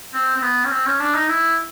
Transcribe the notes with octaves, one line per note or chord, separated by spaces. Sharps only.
C4
C4
B3
C#4
C4
C#4
D4
D#4
E4